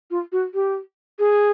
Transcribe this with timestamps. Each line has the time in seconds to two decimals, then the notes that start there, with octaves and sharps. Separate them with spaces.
0.11 F4
0.32 F#4
0.54 G4
1.19 G#4